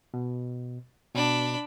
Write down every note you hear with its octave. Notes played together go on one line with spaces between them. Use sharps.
B2
B2 D4 B5